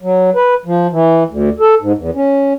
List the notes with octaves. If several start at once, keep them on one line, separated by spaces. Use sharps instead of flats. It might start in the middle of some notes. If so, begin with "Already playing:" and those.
F#3
B4
F3
E3
D2
A4
G#2
E2
C#4